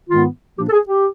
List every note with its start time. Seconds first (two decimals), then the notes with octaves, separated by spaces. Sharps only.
0.08 G#2 D#3 G#3 B3 F4
0.56 A#2 F3 A#3 D4 G4
0.68 A4
0.72 G#4
0.88 G4